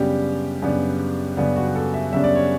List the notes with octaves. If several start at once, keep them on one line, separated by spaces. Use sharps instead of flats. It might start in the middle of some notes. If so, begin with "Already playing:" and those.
Already playing: F#2 C#3 G3 B3 D4 G4
F#2 C#3 G3 B3 D4
F#2 C#3 G3 B3 D4
F#4
A4
E5
F#2 C#3 G3 B3 D4 E5
D5
C#5